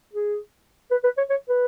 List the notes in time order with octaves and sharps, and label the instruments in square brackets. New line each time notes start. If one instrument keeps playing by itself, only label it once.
[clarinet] G#4
B4
B4
C#5
C#5
B4